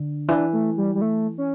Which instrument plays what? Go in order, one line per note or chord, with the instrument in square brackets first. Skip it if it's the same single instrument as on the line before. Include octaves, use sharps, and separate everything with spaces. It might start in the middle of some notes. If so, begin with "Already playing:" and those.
Already playing: [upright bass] D3
[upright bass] E3 [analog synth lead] D4
[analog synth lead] A3
G3
G3
A3
C#4